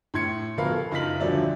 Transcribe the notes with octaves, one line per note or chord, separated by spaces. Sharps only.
A2 C6 G#6 C#7
D1 B2 F3 A#4 F5 B5
A4
F#1 D#4 F4 A#4 B6 F#7
D#1 D3 F3 F#3 D5 E5